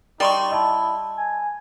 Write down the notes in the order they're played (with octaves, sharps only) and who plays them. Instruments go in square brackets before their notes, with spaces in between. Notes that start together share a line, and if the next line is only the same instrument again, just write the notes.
[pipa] G3 [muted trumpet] D#4 [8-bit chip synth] D5 C6 C#6
[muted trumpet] E4 [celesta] D#5 A5
[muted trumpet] G#5